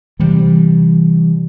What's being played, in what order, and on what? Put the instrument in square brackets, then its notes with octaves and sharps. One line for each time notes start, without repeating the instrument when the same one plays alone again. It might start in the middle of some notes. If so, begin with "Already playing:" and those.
[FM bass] C3 [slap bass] E3 G3